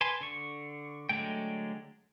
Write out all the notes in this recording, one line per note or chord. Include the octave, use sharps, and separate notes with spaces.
B4 G#5 A5 C6
D3 C#6
D3 F#3 G#3 A3 G5